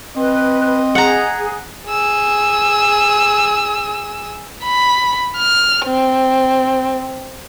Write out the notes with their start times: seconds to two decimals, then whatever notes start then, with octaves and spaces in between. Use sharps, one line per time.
0.16 C4 B4 D#5
0.95 G#4 F#5 A#5
1.86 G#4 E6
4.64 B5
5.37 F6
5.86 C4